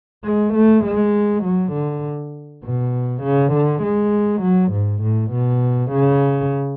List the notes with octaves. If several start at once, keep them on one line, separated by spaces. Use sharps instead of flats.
G#3
A3
G#3
F#3
D3
B2
C#3
D3
G#3
F#3
G#2
A2
B2
C#3